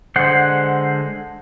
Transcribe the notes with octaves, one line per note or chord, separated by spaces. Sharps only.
D3 G#3 C5 F#5